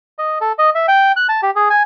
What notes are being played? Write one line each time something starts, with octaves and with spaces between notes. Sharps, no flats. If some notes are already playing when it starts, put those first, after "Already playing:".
D#5
A4
D#5
E5
G5
F#6
A5
G4
G#4
G#5